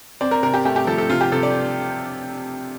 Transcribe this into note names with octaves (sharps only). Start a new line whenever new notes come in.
C4 D5
A#4
C3 A#4
G4
A3 G4
G4
F3 A4
A4
C3 F4
G4
C3 A4
D5